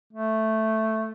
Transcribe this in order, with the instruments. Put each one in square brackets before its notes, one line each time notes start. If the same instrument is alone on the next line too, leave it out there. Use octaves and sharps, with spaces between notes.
[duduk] A3